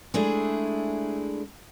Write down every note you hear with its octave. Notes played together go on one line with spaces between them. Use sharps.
G#3 A3 D4 E4 G#4